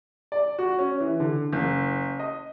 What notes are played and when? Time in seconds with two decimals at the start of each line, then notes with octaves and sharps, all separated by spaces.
0.32 D5
0.59 F#4
0.79 C#4
1.00 E3
1.20 D3
1.53 F#1
2.20 D#5